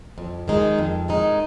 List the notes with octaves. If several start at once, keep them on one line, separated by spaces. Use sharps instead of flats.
F2
D#3 G#3 D#4
F2
D#3 G#3 D#4